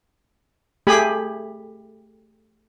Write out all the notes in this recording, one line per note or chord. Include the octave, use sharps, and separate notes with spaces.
A3 G4 G#4 G#5 B5